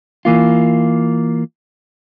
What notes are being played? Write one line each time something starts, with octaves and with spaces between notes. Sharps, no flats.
E3 A#3 F4